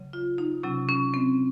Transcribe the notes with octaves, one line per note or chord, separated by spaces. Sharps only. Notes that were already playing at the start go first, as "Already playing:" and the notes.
Already playing: C#3 F#3
F4
D#4
C3 F#3 C#4
C#4
C4